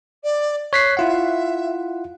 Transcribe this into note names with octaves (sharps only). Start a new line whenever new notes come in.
D5
C#5 F#6 B6 C7
E4 F4 E5 F#5